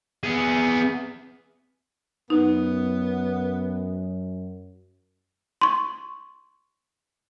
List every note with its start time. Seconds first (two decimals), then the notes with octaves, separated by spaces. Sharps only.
0.24 B3 G#4
2.30 F#2 B3 D#4
5.61 C6 C#6